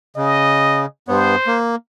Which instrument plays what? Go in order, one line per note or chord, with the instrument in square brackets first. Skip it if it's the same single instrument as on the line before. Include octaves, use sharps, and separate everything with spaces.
[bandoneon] C#3 [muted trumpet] D#5
[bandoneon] G2 B3 [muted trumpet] C5
[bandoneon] A#3